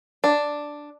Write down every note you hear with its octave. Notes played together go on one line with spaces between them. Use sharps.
D4